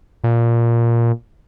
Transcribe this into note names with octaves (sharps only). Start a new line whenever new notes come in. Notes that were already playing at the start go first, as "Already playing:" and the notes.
A#2